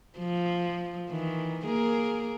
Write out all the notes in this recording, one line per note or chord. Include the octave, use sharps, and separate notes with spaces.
F3
D#3 E3
A#3 G#4 A#4